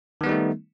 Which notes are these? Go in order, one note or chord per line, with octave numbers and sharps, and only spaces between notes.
D#3 G3 A3 B3 D#4